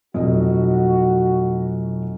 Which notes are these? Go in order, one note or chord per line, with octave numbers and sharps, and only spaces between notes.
F1 B2 F#3 F4 F#4 D#5